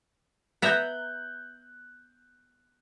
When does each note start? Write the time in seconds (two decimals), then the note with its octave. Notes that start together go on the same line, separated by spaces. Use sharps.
0.62 B3 E5 A#5 F#6 G6